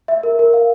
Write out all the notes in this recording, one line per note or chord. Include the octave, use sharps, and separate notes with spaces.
E5
A#4
A#4
F5